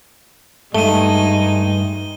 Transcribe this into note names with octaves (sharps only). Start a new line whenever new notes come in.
G2 G#3 A3 D#4 D#7 G7